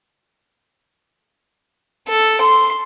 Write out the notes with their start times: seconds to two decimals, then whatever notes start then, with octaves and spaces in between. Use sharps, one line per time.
2.08 A4
2.41 C6